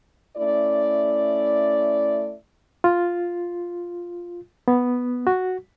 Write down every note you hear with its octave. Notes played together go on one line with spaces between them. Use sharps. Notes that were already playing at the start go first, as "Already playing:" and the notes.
A3 C#4 E4 D5
F4
B3
F#4